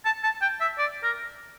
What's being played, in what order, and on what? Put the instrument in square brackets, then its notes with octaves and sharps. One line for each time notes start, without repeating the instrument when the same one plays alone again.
[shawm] A5
A5
G5
E5
D5
A#4